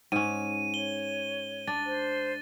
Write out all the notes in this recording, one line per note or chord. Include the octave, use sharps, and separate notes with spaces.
G#2 C#4 D#7
C#5 G7
D4 A6
C5